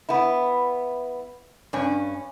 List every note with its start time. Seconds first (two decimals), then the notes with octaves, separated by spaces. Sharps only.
0.09 B3 E4
1.73 G2 C#4